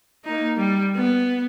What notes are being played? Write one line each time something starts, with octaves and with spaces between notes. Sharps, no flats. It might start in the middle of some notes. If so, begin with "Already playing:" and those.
A#3 D#4
G3
B3